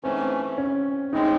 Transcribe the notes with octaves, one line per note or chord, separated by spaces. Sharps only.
G#2 E3 A3 C4 C#4
C#4
A2 G#3 C4 D#4